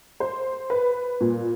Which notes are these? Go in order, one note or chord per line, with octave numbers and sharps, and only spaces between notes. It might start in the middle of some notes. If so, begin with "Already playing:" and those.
C5
B4
A#2